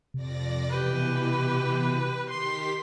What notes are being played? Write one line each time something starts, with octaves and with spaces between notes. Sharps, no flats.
F2 C3 D5 A#6
B2 E3 G4 B4
D#3 G4 C6 B6